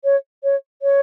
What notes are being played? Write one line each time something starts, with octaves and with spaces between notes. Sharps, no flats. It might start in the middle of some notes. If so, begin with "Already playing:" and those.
C#5
C#5
C#5